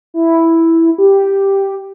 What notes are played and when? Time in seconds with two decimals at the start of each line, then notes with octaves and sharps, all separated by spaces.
0.14 E4
0.98 G4